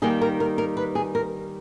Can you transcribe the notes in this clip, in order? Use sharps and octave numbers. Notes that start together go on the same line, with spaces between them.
D#3 G3 A#3 D#4 G#4
A#4
A#4
A#4
B4
G#4
A#4